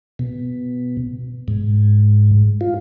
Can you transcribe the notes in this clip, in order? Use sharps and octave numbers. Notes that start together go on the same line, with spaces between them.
B2
G#2
F4